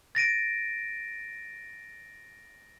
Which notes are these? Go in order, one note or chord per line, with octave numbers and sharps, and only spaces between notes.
A6 A#6 D7 D#7